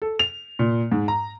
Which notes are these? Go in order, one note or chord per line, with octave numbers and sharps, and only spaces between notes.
A4
F7
A#2
G#2
A#5